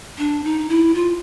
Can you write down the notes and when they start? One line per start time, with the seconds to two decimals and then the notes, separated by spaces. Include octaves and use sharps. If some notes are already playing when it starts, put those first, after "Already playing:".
0.18 D4
0.44 D#4
0.69 E4
0.94 F4